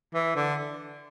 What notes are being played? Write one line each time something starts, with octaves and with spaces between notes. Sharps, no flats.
E3
D3